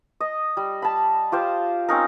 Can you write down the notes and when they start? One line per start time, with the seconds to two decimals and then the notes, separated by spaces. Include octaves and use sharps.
0.20 D#5
0.57 G3
0.82 A5 B5
1.32 F4 G4 C5 F5
1.89 C4 C#4 D#4 A#4